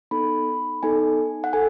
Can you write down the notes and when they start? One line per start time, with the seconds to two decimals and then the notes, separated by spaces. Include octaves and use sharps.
0.11 B3 D#4 A4 B5
0.83 B3 D#4 A4 G#5
1.44 F#5
1.53 A4 G#5